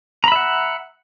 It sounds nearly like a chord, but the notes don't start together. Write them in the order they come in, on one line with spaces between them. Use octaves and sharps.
A#5 B5 E5 F#5